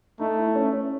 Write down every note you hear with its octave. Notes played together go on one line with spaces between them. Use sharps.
A3 D#4
E4
C#4
C#4